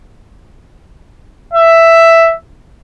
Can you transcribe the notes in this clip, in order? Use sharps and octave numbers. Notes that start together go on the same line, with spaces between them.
E5